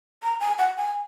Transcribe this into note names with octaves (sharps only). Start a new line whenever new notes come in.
A#5
G#5
F#5
G#5